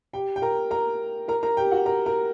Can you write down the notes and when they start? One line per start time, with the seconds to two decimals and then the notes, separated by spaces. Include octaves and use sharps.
0.13 G4 G5
0.36 G5
0.42 A#4 A#5
0.71 A#4 A#5
1.28 A#4 A#5
1.43 A#4 A#5
1.57 G4 G5
1.71 F#4 F#5
1.86 A#4 A#5
2.06 A#4 A#5